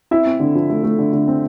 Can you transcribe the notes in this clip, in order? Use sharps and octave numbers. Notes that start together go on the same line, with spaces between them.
C4 E4 E5
C4
D3
F3
A3
A3
D3
D3
C4